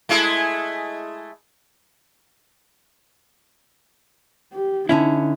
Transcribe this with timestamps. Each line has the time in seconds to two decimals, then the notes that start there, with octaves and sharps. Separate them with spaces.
0.09 G#3 A3 E4
4.53 G4
4.89 D3 C#4 D#4 E4